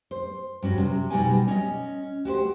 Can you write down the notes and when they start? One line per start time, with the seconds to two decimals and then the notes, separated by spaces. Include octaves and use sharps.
0.11 C5
0.62 G2 C#4 F#4
0.80 C3
1.10 B2 G3 D#4 F#4 G4 G#5
1.48 C#4 D#5
2.25 F#4 G4 B4 C5